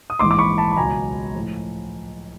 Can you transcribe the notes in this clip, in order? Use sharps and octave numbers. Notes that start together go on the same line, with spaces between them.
D#6
A#1 G#2 E3 C6 D6
D6
B5 C#6
A5 B5
B5
C#2 B2 F#3 G#5 A#5
A2 F3